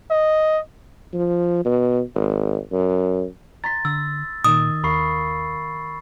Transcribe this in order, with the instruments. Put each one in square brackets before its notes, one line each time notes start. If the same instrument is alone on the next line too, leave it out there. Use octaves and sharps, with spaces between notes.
[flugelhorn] D#5
[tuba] F3
B2
G#1
F#2
[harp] A#5 C6 [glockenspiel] A6 B6
[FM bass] D3 [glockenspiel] E6
[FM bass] A#2 [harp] D#3 D#4 [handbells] D#6
[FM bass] D#2 [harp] A#4 F5 [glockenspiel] B5 C#6 C7